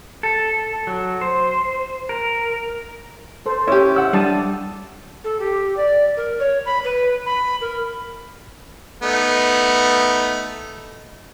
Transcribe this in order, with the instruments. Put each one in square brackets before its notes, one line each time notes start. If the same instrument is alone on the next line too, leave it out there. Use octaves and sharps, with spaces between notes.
[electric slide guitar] A4
F#3
C5
A#4
[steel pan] A4 C5
[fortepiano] C#4 [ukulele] E4 G4
[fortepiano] F#5 E6
[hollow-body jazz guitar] G3 [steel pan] D4 A5 D#6
[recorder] A4
G4
D5
A#4
C#5
B5
B4
B5
A#4
[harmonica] A3 B3 D#4